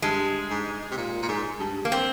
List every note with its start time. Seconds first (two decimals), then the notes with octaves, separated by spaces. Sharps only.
0.02 G2 G#3
0.50 G#2
0.91 C3
0.97 A#2
1.22 A#2
1.29 G#2
1.60 G2
1.85 A#3
1.92 C4